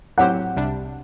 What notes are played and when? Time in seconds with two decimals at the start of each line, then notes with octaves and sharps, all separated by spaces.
0.18 A2 F#3 C4 G4 C5 F#5
0.56 C2 C3 G3 D4